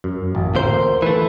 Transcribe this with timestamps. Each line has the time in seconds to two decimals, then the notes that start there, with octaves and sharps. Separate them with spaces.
0.04 F#2
0.35 A1
0.55 D2 A#3 C5
1.02 E3 A3 B4